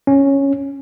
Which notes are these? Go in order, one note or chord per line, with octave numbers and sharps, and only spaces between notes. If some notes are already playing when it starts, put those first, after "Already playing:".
C#4